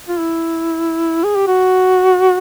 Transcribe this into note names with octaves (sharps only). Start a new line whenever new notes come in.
F4
E4
G#4
G4
F#4